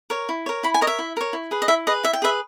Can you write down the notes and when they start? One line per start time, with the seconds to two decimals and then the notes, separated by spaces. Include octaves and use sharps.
0.10 A#4 C#5
0.29 E4
0.46 A#4 C#5
0.63 E4 B5
0.74 G#5
0.81 A#4 C#5 D#5
0.87 E5
0.99 E4
1.17 A#4 C#5
1.33 E4
1.51 G#4 B4
1.62 D#5
1.68 E4 E5
1.87 G#4 B4 D#5
2.03 E4 E5
2.13 G5
2.22 G#4 B4 E5